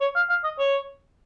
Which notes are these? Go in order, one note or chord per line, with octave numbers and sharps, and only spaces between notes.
C#5
F5
F5
D#5
C#5